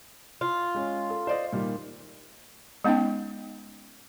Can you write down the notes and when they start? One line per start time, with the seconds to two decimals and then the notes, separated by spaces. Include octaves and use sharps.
0.41 F4
0.75 G#3 C#4
1.10 A4
1.27 C5 D5 D#5
1.53 A#2 D#3 G3
2.84 G#3 B3 C#4 D#4 G5